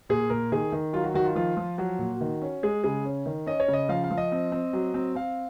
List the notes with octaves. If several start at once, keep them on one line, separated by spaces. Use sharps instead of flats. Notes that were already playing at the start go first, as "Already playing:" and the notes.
A#2 G#4
A#2 A#4
D#3 G#4
D#3
F#3 F4
F#4
D#3 F#4
F4
F3 F4
F3
F#3 F#4
A#2
D#3
C#4
G#3 G#4
C#3 G#4
C#4
D#3
C#4 D#5
C#5
C#3
D#5
F3 F5
F5
F3
D#5
C4
C4
F#3
C4
C4 F5